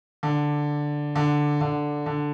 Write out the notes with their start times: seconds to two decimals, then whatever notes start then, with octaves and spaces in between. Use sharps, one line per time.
0.23 D3
1.16 D3
1.61 D3
2.06 D3